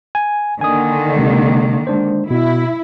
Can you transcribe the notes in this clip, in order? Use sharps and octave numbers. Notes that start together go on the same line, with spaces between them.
G#5
D3 D#3 A#3 G#5 D#6
C3 G#3
G#3 D4 C5
B2 E4